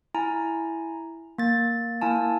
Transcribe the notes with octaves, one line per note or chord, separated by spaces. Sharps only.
E4 G#5 A#5
A#3 A6
A#3 E4 G#5 A5